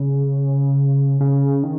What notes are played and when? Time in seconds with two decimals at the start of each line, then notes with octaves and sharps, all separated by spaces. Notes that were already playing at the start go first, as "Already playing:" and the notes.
Already playing: C#3
1.20 C#3
1.63 D#3